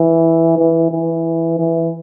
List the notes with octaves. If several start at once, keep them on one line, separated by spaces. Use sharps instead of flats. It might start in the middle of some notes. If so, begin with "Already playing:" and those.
Already playing: E3
E3
E3
E3